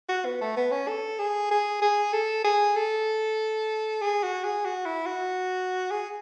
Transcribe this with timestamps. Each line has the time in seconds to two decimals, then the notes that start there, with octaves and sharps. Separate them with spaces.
0.09 F#4
0.25 B3
0.41 A3
0.57 B3
0.72 C#4
0.88 A4
1.19 G#4
1.51 G#4
1.82 G#4
2.13 A4
2.45 G#4
2.76 A4
4.02 G#4
4.23 F#4
4.44 G#4
4.65 F#4
4.86 E4
5.06 F#4
5.91 G#4